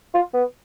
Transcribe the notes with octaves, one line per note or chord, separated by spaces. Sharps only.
F4
B3